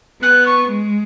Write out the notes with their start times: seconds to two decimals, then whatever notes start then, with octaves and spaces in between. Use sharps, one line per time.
0.22 B3 F#6
0.45 C#6
0.69 G#3